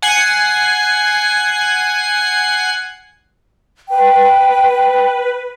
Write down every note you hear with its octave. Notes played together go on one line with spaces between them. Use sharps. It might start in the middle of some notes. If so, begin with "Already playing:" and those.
F#5 G#5 C7
B4 G5